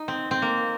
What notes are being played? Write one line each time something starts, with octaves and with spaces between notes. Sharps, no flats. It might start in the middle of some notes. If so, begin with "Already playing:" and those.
Already playing: D#4
C4
C4
A#3